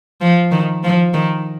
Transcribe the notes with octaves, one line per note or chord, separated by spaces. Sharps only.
F3
D#3
F3
D#3